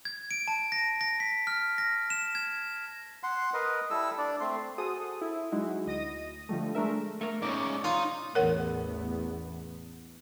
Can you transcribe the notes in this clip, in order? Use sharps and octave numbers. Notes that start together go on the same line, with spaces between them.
G#6
D7
A5
A#6
A#6
B6
F6
A#6
E7
G#6
F#5 C6
A#4 B4 D#5
G3 E4 A4 E6
D4 D5
A3 C4 C6
F#4 G#4 A4 C5 D#6
E4
F#3 G#3 D#4 E4 F#4
D2 D#5 A#6 D#7
D3 F3 G3 A3
G#3 A3 D4 A#4 E5
A3 A#4
G#2 C#3 C#5 D5
D#4 F4
A1 E2 B3 A#4 C#5 F#5